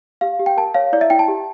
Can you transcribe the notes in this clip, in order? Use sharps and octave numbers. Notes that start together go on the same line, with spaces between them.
G4 F5
G4
G5
A#4 A5
C#5 F5
E4 D5
E5
E4 G5
A5
G4